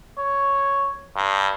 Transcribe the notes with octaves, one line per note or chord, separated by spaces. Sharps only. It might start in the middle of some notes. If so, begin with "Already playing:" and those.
C#5
G2